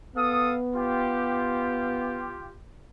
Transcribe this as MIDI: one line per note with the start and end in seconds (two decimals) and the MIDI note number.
0.16 2.38 59
0.16 0.55 69
0.16 0.55 77
0.16 0.55 87
0.74 2.57 65
0.74 2.57 67